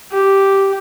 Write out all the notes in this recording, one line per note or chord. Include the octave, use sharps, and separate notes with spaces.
G4